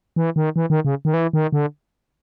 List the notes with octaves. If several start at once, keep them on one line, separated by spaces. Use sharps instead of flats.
E3
D#3
E3
D#3
C#3
D#3
E3
D#3
D3